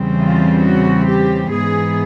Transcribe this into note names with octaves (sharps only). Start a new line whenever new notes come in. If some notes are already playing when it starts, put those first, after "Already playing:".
Already playing: E2 C#3 E3 G3 C4
F4
F#4
G4
G#2 E3 G#3 B3 G#4